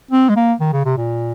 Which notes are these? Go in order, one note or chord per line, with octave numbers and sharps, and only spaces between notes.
C4
G#3
A#3
D#3
C#3
C3
A#2